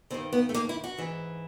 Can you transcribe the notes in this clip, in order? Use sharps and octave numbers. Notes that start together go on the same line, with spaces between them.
G2 D#3 C4
B3
A3
A#3
E4
F#4
G#2 E3